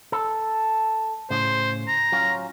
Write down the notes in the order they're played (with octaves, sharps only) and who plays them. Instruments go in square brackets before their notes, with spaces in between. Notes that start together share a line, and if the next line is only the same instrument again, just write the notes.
[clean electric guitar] A4
[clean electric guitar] A2 C#3 [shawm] C5
[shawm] A#5
[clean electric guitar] F#3 C#4 F4